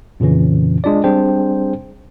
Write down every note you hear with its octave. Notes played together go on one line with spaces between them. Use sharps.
F2 A#2 C#3 E3 C#4
G#3 D4 F4 D5
G3 C4 D4 G#4 C5 G5